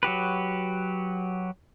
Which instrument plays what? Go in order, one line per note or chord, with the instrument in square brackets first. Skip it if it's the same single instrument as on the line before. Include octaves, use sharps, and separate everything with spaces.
[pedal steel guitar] F#3 F#4 G4 B4